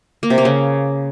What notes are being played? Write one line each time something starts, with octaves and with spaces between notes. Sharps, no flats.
A#3
C3
A#3
C#3